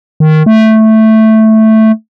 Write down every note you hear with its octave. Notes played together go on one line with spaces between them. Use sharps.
D#3
A3